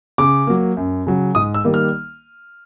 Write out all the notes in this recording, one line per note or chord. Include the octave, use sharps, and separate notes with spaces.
C#3 D6
F#3 A#3
F#2
C#3 F#3
G#2 D#6
E6
D#3 G3 A#3
F6